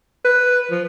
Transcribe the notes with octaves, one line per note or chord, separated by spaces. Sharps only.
B4
F3